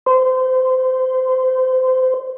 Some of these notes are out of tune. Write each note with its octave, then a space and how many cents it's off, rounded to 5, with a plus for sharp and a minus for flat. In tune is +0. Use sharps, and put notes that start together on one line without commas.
C5 -25